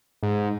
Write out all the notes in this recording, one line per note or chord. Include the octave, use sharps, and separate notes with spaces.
G#2